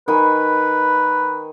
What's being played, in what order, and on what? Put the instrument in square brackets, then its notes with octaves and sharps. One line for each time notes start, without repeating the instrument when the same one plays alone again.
[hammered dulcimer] D#3 G#5 B5 [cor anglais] B4